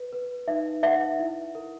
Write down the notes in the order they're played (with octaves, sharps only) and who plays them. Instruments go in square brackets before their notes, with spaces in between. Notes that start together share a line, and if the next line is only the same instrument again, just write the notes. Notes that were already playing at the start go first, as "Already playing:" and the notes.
Already playing: [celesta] B4
B4
[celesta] D#4 [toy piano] E5
[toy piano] E5 [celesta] F#5
[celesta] E4
A#4